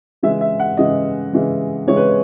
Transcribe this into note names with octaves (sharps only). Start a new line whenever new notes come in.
C#3 E3 G#3 E5
E5
F#5
C#3 E3 G#3 D#5
C#3 E3 G#3
C#3 E3 G#3 C#5
B4